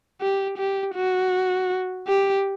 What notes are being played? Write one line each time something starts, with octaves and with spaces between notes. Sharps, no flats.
G4
G4
F#4
G4